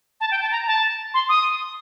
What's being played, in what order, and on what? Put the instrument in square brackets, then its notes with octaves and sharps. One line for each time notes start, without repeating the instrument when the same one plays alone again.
[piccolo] A5
G5
A5
A#5
A5
C6
D#6